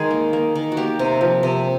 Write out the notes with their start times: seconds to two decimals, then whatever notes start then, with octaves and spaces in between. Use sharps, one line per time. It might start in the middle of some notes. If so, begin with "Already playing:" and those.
Already playing: D#3 G#3 G#4
0.11 A#3
0.33 A#3
0.55 D#3
0.72 F#4
0.77 A#3 G4
0.99 C3
1.21 F3
1.43 C3